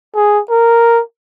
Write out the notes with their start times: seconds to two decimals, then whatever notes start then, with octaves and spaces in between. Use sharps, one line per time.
0.15 G#4
0.50 A#4